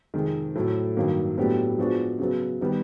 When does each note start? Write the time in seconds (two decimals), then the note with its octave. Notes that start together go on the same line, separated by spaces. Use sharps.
0.14 F2 C3 D#3 G#3
0.55 A2 F#3 A3
0.97 G2 D#3 F#3 A#3
1.37 A2 F#3 B3 D4 G4
1.78 F3 G#3 B3 D4 F#4
2.19 C#3 F#3 B3
2.61 D#3 G3 B3